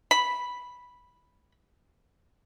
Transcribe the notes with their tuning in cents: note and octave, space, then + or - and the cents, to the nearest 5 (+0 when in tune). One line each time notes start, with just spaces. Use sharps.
B5 -5